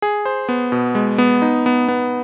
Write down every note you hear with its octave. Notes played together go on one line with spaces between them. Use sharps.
G#4
C5
B3
B2
G#3
B3
D#4
B3
B3